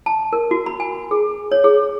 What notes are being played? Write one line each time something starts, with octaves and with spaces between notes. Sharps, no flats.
A5
A#4
F#4
B5
G#5
G#4
C#5
G#4